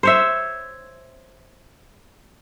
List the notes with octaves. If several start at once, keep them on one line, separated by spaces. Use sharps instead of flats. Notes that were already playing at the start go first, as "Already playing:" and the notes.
C5 C#5 E5